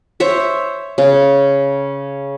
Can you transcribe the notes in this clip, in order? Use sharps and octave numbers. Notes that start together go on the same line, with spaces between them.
C5 C#5 E5
C#3